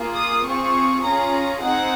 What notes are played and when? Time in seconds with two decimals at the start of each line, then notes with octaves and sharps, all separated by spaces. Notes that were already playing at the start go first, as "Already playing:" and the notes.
Already playing: A#3 F4 G#4
0.15 D#6
0.44 C4 F4 G#4 C#6
1.03 C#4 F4 G#4 A#5
1.61 C4 D#4 G#4 F#5